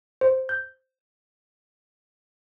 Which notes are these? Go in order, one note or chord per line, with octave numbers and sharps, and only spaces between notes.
C5
G6